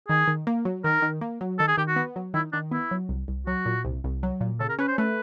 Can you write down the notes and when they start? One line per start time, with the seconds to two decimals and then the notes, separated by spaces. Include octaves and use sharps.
0.08 D#3 G#4
0.28 D#3
0.47 A#3
0.65 F#3
0.84 D#3 A#4
1.02 D#3
1.21 A#3
1.41 F#3
1.59 D#3 A4
1.68 G#4
1.77 D#3 G4
1.88 F#4
1.96 B3
2.16 F#3
2.34 D#3 E4
2.53 D#3 D4
2.71 B3 E4
2.91 F#3
3.09 C2
3.28 C2
3.47 F#3 F#4
3.66 A#2
3.85 C2
4.04 C2
4.23 F#3
4.41 A#2
4.60 C#3 A4
4.69 A#4
4.79 C#4 B4
4.88 C5
4.98 A3 B4